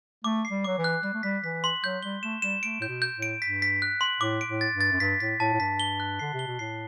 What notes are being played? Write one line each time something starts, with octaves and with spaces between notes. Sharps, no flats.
A3 D6
C7
G3
F#3 D6
E3
F#6
G3 F#6
A3
G3 B6
E3 B6
C6
F#3 G6
G3 G7
A3 E7
G3 E7
A3 D7
A2 G6
B2
G6
A2
D7
G2 B6
B6
F#6
C6
A2 D6
D7
A2
A6
G2
A6
F#2
G2 B6
A2 B6
A2 A5
A2
G2 B6
G7
F#6
D3 C7
C3
G7
B2
A2 C7